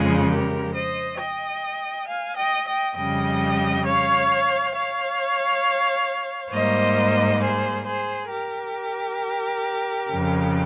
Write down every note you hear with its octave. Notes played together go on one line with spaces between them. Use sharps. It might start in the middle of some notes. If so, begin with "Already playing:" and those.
Already playing: F2 C#3 F3 G#3 F4 G#4
G4 A#4
C5 D#5
D#5 G5
F5 G#5
D#5 G5
D#5 G5
F2 C#3 G3 D#5 G5
C#5 F5
C#5 F5
G#2 G3 A#3 C5 D#5
G#4 C5
G#4 C5
G4 A#4
F2 C#3 F3